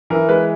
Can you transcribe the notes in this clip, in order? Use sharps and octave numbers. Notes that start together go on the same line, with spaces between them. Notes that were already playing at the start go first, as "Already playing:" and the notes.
E3 A#4
G#3 B4